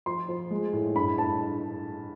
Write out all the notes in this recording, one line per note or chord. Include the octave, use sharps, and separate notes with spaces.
F3 C6
F3
G#3
A2
G2 B5
G2 A5